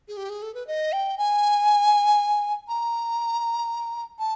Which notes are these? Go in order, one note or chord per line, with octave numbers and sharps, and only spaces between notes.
G#4
G4
G#4
A4
B4
D#5
G5
G#5
A#5
A5